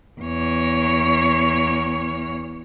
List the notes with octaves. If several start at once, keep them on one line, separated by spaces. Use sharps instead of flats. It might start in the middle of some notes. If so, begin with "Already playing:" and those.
E2 C#5